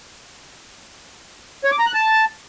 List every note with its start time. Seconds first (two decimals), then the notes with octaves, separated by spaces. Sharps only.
1.64 C#5
1.72 D6
1.79 A#5
1.86 F#6
1.94 A5